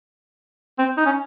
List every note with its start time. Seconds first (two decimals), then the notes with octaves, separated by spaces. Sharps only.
0.79 C4
0.97 D#4
1.06 C#4